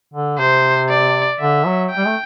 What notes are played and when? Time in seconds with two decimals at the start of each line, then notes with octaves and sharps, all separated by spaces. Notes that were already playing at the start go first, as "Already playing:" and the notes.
0.14 D3
0.39 C3 C5
0.90 D5
1.40 D3 E5
1.66 F#3
1.91 G5
1.97 G3
2.07 A3